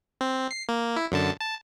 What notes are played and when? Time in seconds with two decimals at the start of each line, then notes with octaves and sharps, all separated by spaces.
0.21 C4
0.51 C7
0.69 A#3
0.96 E4
1.12 F#2 D3 A5
1.40 A5